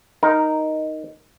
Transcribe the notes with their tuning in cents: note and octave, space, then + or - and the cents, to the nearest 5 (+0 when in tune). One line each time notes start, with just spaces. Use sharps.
D#4 +0 A#4 +0